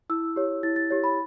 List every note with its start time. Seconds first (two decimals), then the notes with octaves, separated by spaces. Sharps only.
0.10 E4 E6
0.36 G4 C#5
0.63 E4 A6
0.76 A6
0.90 G4 C#5
1.04 B5